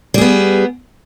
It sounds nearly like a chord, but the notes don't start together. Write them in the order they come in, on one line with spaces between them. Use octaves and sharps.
G3 G#4 B3